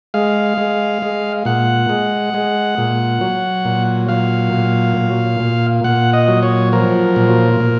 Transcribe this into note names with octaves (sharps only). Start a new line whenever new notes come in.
G#3 F5
G#3
G#3
A#2 F#5
G#3
G#3
A#2
F#3
A#2
F#3 F5
A#2
A#2
A#2
A#2 F#5
D#5
F#3
C#5
F3 A#4
A#2
A#2